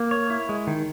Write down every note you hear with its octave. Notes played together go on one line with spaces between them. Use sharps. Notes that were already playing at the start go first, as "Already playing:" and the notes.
Already playing: A#3
C#5
E4
G#3
D#3